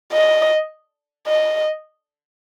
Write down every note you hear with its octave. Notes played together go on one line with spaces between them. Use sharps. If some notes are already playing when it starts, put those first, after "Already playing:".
D#5
D#5